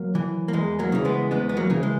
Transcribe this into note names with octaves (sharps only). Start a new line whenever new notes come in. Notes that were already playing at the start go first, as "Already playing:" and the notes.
Already playing: F#3 A#3
E3
A#3
E2 G#3
F#3 A#3
C#3 E3
G#3 B3
E2 G#3 B3
B3
F#3 A#3
C#3 E3
G#3